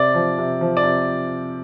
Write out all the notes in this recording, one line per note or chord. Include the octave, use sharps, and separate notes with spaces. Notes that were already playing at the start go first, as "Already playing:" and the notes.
Already playing: C3 D5
F3
C3
F3
D5
C3